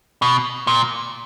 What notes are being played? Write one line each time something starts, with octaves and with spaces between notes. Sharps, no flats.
B2
A#2